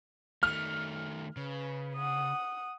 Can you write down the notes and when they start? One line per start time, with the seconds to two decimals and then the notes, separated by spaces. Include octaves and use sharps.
0.43 D#3 A3 F6
1.37 C#3 B4
1.96 F#5 D#6